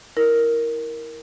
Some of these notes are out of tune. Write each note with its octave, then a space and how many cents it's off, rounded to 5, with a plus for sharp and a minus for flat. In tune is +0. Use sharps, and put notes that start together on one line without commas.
E4 -15 A#4 +0